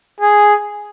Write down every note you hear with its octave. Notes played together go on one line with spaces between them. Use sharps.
G#4